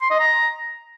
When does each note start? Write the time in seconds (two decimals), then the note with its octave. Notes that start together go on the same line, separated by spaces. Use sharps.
0.02 C6
0.11 D#5
0.19 A#5